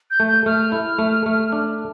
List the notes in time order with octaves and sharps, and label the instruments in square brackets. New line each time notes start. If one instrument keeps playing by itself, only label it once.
[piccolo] G6
[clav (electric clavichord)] A3
[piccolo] G6
[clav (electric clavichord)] A3 [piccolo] F6
[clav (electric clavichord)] E4
A3
A3
D4